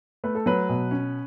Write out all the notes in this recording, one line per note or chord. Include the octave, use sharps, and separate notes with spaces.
A3 B4
A4
F#3 B4
B2
C#4